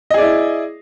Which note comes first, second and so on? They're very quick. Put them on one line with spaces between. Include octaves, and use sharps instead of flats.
D#5 G#4 D5 E4